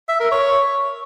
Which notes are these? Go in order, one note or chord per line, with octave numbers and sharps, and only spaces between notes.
E5
A#4
C#5